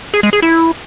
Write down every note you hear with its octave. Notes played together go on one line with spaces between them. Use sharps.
G#4
G#3
G#4
E4